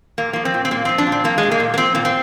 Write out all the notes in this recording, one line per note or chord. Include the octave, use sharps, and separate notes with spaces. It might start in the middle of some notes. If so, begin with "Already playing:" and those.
A#2 A#3
F3 A#3
C4
A#2
C4
A#2 A#3
F3 C4
D4
A#2
C4
F3 A#3
G#3
A#2
A#3
A#2
A#3
F3 C4
A#2 A#3
C4